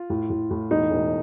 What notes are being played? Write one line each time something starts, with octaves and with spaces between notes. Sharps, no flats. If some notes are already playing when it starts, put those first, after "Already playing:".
Already playing: F4
A2
A2
A2
E1 D#4
E1